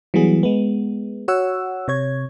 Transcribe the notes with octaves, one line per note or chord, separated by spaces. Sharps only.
E3 F#3 G3 B3 G#4
G#3 B3
F#4 C#5 F#5 E6
C3 C#5 G#6